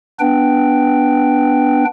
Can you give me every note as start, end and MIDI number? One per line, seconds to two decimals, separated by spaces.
0.19 1.84 59
0.19 1.84 62
0.19 1.84 71
0.19 1.84 79